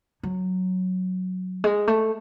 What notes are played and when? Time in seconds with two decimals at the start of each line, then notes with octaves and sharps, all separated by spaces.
0.23 F#3
1.64 G#3
1.87 A3